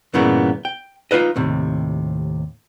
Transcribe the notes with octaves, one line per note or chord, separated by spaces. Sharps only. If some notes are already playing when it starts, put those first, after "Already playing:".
G2 A#2 C#3 E3 A#3 B3
G5
D#4 F4 A#4 B4 D#5
D#2 A2 C3